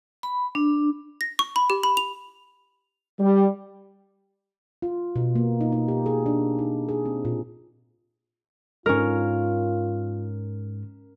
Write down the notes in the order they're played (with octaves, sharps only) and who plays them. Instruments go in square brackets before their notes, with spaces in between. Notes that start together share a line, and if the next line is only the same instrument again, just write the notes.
[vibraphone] B5
D4
[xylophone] A#6
C#6
B5
G4
B5
F7
[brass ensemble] G3
[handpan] F4
B2
A#3
D#4
D#4
G4
G#4
D4
D#4
G#4
C4
A#2
[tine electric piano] G#2 G#3 [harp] C#4 A#4 [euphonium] F4